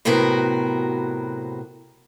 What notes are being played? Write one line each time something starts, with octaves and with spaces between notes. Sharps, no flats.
A2 C3 F#3 B3 F#4 A#4